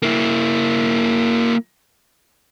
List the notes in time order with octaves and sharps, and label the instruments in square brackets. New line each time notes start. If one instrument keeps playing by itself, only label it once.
[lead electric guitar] A#3 E4